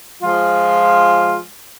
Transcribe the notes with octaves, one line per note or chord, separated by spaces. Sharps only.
F3 G#3 F4